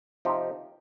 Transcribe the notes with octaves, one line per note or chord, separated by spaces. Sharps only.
C3 F3 C4 D#4 G4